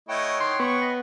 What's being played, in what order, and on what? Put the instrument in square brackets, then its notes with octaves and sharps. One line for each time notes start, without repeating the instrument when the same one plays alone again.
[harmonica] A3 E4 D#5 [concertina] C#5 F#5 G5
[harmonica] D#3 [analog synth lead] C6
[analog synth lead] B3 [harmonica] C#6
[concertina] D#5 B5